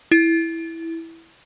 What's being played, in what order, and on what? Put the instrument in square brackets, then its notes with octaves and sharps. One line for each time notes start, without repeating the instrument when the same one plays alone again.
[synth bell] E4